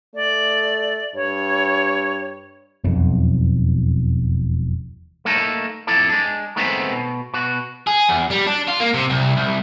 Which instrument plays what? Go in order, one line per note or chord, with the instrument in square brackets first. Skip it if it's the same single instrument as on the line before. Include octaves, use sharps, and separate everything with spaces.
[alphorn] A3 [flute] D5
[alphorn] G2 [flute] C#5
[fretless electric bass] E1 B1 F2
[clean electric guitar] A3 A#3 D#4 A4
F2 E4 A4 D5
G#3 D4
D#3 G#3 A3 B3 C4
B2
B2 F#4
[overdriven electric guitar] G#4
E2
G3
D4
F4
A#3
C3
C2
C2